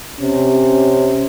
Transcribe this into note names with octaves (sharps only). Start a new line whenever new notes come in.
C3 C#4